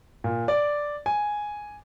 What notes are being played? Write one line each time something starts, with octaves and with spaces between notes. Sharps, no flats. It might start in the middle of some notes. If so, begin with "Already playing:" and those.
A#2
D5
G#5